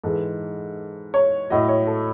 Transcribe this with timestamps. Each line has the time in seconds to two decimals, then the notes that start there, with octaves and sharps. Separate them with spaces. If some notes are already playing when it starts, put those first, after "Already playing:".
0.04 G#2 E3 G#3 A4
1.14 C#5
1.50 A2 F#3 D#5
1.69 C#5
1.87 A4